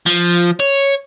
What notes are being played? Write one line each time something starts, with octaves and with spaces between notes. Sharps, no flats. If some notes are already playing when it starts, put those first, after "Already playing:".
F3
C#5